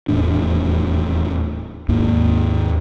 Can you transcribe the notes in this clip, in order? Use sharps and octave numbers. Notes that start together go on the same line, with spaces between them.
D#1 E2 A2 D4
D#2 G#2 A#3